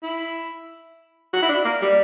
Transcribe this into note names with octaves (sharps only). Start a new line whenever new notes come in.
E4
F#4
E4
D4
A#3
G3